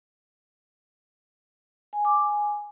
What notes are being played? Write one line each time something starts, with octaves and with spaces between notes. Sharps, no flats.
G#5
D6
G#5